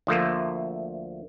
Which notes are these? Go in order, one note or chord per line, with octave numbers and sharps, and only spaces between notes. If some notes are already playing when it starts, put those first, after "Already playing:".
D2 F3 A3 A#3